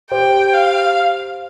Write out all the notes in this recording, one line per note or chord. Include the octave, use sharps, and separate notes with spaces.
G4 C5 G5
F5